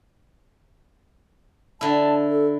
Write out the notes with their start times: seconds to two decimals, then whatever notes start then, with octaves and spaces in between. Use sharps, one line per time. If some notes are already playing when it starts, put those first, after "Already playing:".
1.81 D3 E4 A5
2.29 A4